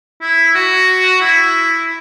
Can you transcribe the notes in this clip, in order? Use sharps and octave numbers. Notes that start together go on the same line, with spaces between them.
E4
F#4
E4